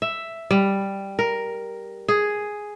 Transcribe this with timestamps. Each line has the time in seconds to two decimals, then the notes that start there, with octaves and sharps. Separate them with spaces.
0.02 E5
0.51 G3
1.19 A#4
2.08 G#4